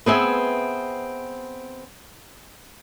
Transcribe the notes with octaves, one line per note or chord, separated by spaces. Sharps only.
B3 C4 G#4 E5